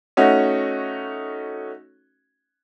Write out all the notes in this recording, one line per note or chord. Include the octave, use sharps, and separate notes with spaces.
A3 C#4 D#4 F#4